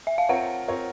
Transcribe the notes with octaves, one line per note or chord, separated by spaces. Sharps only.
E5
F5
C4 F4 A#4 C#5 F#5
C4 F4 A#4 C#5